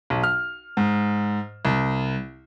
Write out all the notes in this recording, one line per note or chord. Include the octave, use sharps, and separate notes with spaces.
B1
F6
G#2
C2